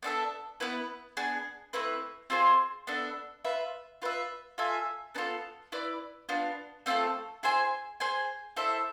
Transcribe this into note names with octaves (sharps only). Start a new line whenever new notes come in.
B3 D4 A4 E5
B3 E4 B4
B3 D4 G#4
A3 C4 E4 B4
C4 F4 G#4 C5
B3 D4 A4 E5
F4 B4 E5
F4 B4 E5
F4 A4 E5 G#5
B3 D4 F4 A4
E4 B4 D5
B3 D4 F4
A3 C4 F4 A4
E4 G#4 C5 G#5
G#4 C5 G#5
E4 A4 C5 E5